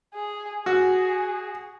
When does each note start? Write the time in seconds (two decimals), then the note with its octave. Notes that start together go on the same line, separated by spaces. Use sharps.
0.14 G#4
0.66 F#4 G#4